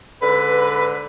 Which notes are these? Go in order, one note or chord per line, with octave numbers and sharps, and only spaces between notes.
G#2 D3 B4